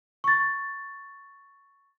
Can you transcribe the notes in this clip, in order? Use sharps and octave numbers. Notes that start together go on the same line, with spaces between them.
C#6 A6